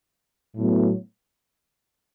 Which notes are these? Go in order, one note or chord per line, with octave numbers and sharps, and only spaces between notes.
A2 F#3 B3